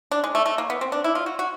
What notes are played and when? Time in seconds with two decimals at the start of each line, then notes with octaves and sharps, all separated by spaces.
0.11 D4
0.24 G#3
0.35 A3
0.46 A3
0.58 A#3
0.70 B3
0.81 C4
0.92 D4
1.04 E4
1.15 F4
1.26 F#4
1.39 F#4